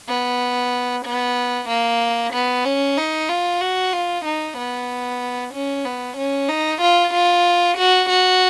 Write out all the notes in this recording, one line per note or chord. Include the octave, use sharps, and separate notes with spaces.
B3
B3
A#3
B3
C#4
D#4
F4
F#4
F4
D#4
B3
C#4
B3
C#4
D#4
F4
F4
F#4
F#4